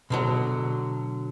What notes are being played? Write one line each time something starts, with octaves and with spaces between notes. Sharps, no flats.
B2 D3 F#3